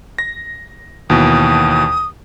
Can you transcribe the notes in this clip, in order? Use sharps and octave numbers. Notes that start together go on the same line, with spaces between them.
A#6
D#2 B2 E3 D#6